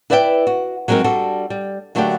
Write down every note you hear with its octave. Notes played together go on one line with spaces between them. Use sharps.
E4 B4 D5 E5 F#5 G5
F#4
F#3 G#3 C4 D#4 A#4
G3 D4 F#4 A4
G3
D3 F#3 A3 A#3 D4 G4